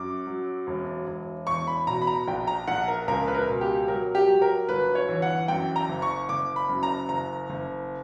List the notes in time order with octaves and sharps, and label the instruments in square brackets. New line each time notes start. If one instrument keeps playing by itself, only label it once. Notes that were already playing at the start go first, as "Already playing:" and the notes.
Already playing: [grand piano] F#2 D6
F#3
E1
E1
E2 C#6
B5
B2 A#5
B5
A#5
A#1 G5
A#5
A#1 F#5
A#4
C#2 A#4
B4
A#4
B2
G4
F#3 A#4
G4
F#3
A#4
G1 B4
C#5
E3
F#5
F#2 G5
A#5
F#1
C#6
F#1 D6
B5
F#2
A#5
F#1 A#5
F#1